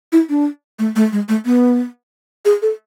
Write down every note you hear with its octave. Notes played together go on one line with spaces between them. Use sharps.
E4
D4
A3
A3
G#3
A3
B3
G#4
A4